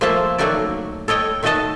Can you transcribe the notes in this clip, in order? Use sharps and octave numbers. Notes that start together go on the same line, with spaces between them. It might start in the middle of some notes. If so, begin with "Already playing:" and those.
F3 A3 A#3 C5 E5 A5
D#3 F#3 A3 A#3 F#4 D5
A4 C#5 D#5 G5
D#3 A3 F#4 A4 D#5 A5